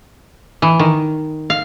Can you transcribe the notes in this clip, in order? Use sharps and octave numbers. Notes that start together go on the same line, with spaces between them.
E3
D#3
F5